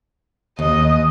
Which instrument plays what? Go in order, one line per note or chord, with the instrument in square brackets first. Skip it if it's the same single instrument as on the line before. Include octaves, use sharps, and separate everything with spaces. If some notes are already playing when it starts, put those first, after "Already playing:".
[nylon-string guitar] D#2 [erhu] D#5